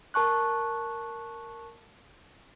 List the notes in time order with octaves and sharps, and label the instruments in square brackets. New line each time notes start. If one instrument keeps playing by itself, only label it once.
[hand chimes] A#4 A5 C#6 F#6